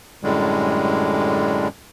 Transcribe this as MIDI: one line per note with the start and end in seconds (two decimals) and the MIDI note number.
0.23 1.68 42
0.23 1.68 45
0.23 1.68 50
0.23 1.68 55
0.23 1.68 56